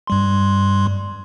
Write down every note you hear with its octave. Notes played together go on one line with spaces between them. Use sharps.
G2 G3 C6